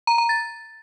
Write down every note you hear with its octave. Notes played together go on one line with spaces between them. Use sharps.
A#5
A#5
A6